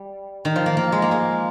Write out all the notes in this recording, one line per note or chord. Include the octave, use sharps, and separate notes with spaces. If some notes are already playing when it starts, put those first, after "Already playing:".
Already playing: G3
D#3
F3
A#3
A#3
G#3
A#3
G#3